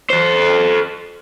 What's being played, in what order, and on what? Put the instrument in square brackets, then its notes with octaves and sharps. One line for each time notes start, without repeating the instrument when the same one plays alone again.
[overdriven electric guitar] A4 C5